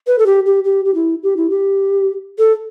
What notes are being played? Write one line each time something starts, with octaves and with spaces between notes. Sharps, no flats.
B4
A4
G4
G4
G4
G4
E4
G4
E4
G4
A4